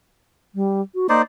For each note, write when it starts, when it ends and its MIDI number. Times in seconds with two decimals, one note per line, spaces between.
0.55 0.81 55
0.95 1.07 66
1.09 1.22 58
1.09 1.22 63
1.09 1.22 72
1.09 1.22 74